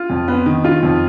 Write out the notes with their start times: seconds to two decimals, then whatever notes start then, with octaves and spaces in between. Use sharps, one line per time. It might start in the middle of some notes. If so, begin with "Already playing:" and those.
Already playing: F4
0.10 F2
0.28 B3
0.46 D#3
0.64 F4
0.83 F2